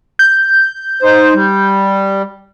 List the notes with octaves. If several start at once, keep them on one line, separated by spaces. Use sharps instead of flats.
G6
D#4 C5
G3